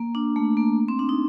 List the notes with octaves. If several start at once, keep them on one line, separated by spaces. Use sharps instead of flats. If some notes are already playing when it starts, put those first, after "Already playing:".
Already playing: A#3
D4
A3
A#3
C4
D4
D#4